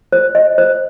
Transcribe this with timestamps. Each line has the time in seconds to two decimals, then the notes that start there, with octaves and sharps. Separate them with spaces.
0.12 C5
0.35 D#5
0.58 C5